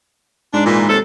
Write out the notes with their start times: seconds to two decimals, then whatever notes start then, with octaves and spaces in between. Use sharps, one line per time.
0.54 G#2 D4
0.65 A#2 E3
0.88 D#2 C3 A4